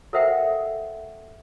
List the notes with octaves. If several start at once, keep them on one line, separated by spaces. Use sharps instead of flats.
A4 A#4 C5 E5 F#5 G5